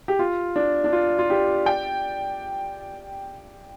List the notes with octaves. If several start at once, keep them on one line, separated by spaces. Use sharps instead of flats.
G4
F4
D4
D4
F4
F4
D4 G4
D5 G5